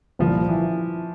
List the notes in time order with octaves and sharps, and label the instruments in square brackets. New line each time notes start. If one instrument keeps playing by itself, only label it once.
[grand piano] C2 A#2 G3 C4 [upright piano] F3
[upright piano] E3